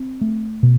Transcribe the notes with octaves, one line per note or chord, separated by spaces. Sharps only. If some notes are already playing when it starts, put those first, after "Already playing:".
Already playing: C4
A3
B2